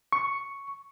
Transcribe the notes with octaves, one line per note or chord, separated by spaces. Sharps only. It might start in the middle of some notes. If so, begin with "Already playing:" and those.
C#6